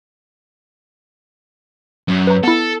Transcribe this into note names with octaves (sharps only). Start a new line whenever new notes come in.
F#2
B4 A#5
B3 E4 A4